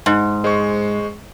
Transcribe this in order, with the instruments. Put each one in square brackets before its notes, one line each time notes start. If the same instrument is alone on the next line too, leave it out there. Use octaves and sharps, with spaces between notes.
[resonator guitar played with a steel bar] G#2
[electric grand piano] G#3 C5 C#6